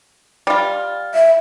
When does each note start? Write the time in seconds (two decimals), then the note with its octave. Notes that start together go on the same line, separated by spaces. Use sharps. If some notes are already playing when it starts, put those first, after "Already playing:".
0.47 G3 F4
1.14 E5